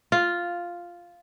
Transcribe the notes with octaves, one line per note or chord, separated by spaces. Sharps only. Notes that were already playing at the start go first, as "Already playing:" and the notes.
F4